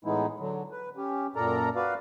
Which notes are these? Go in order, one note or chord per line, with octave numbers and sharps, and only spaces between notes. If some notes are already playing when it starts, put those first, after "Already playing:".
A2 E3 G#3 B3 D#4 E4
D3 F#3
B4
C#4 G4
F#2 A#2 A4 A#4 D5 A#5
F#4 B4 D5 F5